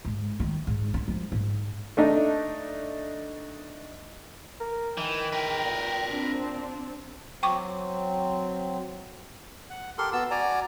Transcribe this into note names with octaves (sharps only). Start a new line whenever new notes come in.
G#2
D#3
G#2
D4
F3
G#2
A3 D4 D#4
A#4
D#3 E3 G5
A#4 B4
A#2
C4 D4
F#3 C4 G5 C#6 D6
F#5
G4 A4 A#4 C6
B3 F#4 A5 E6
F#4 D5 G#5 A#5